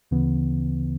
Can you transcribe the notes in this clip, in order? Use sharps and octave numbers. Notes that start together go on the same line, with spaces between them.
D2 C#3 E3 B3